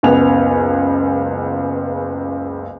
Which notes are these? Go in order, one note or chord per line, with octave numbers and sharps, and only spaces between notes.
F#1 C#2 B3 G#5 F7